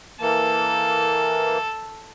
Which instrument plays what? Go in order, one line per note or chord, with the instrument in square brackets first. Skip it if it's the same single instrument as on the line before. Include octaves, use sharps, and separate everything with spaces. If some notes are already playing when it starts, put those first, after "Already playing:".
[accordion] E3 A#3 [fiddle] A4